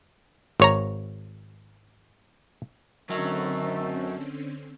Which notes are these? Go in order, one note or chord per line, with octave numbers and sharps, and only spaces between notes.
G#1 C#5 A#5
F#2 D3 D#3 F#3 A3 C4 C#4